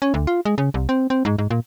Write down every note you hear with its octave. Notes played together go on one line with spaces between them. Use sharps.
C#4
D2
F4
G#3
C#3
C2
C4
C4
G#2
G#2
A#2